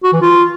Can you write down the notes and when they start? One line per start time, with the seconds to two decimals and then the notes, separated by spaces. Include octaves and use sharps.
0.04 F#4
0.13 E3
0.22 F4